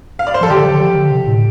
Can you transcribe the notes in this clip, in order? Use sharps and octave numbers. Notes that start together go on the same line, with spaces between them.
F5
D5
C5
F3 A4
D3 G4
D3
F3
D3
C3
A2